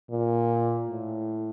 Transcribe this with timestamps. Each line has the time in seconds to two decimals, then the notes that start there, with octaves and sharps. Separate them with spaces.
0.10 A#2
0.89 A2